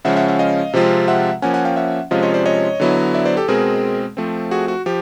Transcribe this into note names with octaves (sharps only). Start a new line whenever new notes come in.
C#3 F3 G#3 C#4 E5 F#5
E5 F#5
E5 F#5
D#5 F5
C3 F3 G#3 C4 F4
E5 F#5
F3 A#3 C#4 F#5 G#5
F#5 G#5
F5 G5
E5 F#5
C3 F3 G#3 C#4 F4 D#5 F5
C#5 D#5
C5 D5
C#5 D#5
D3 F#3 B3 E4
D5 E5
C5 D5
G4 A4
B2 G#3 C4 G#4 A#4
F3 A3 C4
F#4 G#4
F#4
F3 G4